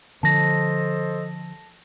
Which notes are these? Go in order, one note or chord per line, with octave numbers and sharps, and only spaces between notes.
D3 F3 A4 C5 D#5 A5 A#6